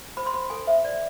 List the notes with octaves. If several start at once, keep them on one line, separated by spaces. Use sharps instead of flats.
C5 B5
C6
C5 B5
A4 G#5
C5 E5
C5 D5